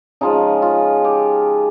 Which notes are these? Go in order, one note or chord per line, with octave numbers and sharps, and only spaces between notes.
C#3 F3 G#3 D#4
F4
G4